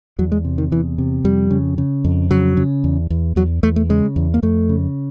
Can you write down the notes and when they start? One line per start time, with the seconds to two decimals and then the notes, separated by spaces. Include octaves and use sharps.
0.19 E2 F#3
0.32 G#3
0.45 C3
0.58 D#3
0.71 E2 E3
0.98 C3
1.24 F2 G3
1.51 C#3
1.78 C#3
2.04 F2
2.30 C#3 F#3
2.57 C#3
2.84 E2
3.10 E2
3.36 E2 F#3
3.63 E2 A3
3.76 A3
3.89 C#3 G#3
4.16 E2
4.34 A#3
4.43 F2 A3
4.69 C#3